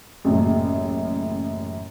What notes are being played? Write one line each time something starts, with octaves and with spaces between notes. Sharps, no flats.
A1 F#2 A#2 C#3